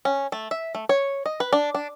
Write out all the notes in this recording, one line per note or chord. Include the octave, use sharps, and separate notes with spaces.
C#4
A3
E5
A3
C#5
D#5
B4
D4
D4